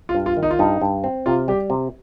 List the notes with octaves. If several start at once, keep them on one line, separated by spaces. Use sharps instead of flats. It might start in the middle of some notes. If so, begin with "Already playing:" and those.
F4
G2
F4
D#3
D#4
F4
G2 D#4
G2
C4
C3 F4
G3 G4
C3